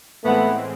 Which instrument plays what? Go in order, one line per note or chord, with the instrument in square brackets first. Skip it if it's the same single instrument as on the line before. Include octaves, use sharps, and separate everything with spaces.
[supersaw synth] A2 E3 G#3 C4 [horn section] A3 B3